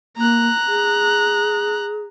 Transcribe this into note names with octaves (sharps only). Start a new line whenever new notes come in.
A#3 A#5 F#6
G#4